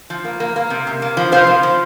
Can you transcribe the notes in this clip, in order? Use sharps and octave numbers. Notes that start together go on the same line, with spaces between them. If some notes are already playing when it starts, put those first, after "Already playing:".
F3
A#3
A#3
A#3
C3
C3
A#3
F3
C3 C5 F5
F3
F3